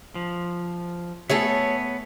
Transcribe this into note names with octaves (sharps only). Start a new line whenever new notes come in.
F3
A3 B3 G#4 A4 C#5